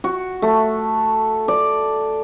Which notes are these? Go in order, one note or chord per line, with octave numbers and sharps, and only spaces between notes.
F#4
A3
D5